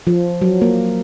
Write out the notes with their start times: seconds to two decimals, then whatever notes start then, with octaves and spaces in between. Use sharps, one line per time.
0.07 F3
0.42 F#3
0.62 A#3